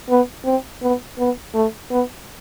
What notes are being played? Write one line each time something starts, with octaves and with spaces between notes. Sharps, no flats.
B3
C4
B3
B3
A3
B3